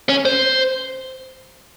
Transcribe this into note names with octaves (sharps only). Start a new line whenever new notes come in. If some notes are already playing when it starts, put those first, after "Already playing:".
C#4
C5